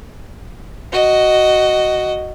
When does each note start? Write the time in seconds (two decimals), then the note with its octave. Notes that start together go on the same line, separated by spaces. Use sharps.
0.92 F#4 D#5